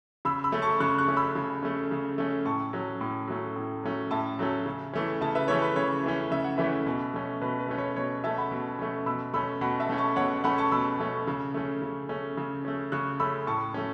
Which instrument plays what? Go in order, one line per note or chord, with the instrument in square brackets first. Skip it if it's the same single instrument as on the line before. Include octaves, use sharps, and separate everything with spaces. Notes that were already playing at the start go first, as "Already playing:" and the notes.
[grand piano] C#3 B5 E6
B5 E6
A3 C#4
A5 C#6
C#3 C#6 F#6
C#6 F#6
A3 C#4
B5 E6
C#3
A3 C#4
C#3
A3 C#4
A2 A5 C#6
F#3 A3 C#4
A2
F#3 A3 C#4
A2
F#3 A3 C#4
A2 E5 A5
F#3 A3 C#4
C#3
E3 A3 C#4
C#3 E5 A5
B4 E5
E3 A3 C#4 C#5
B4
C#3 C#5
E3 A3 C#4
C#3 E5
F#5
E3 A3 C#4 B4 E5
B2
A3 C#4
B2 B4
B4
A3 C#4
C#5
B2 C#5
A3 C#4 E5 A5
F#5 B5
B2
A3 C#4
B2 B5 E6
A3 C#4 B5 E6
B2 F#5 B5
E5 A5
A3 C#4
A5 C#6
B2 C#5 F#5
A3 C#4 F#5 B5
A5 C#6
B2 B5 E6
A3 C#4
C#3
A3 C#4
C#3
A3 C#4
C#3
A3 C#4
C#3 C#6 F#6
A3 C#4 B5 E6
A2 A5 C#6
A3 C#4